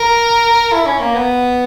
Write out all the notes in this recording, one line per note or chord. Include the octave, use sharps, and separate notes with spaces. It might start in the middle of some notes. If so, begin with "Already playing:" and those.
Already playing: A#4
E4
C#4
A#3
B3